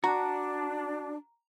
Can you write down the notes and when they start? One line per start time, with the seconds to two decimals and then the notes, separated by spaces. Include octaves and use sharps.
0.04 D4 F#4 A#5